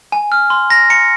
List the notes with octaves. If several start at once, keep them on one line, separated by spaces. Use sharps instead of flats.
G#5
F6
C6
A#5 A#6
A#5 C#7